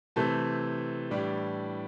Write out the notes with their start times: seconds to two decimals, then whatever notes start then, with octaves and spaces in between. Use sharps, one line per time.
0.16 C3 E3 A3 C4 A5
1.10 A2 E3 G3 D4